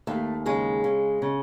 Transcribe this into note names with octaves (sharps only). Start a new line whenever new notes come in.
D#2 A3
C#3 G#3
C#3
C#3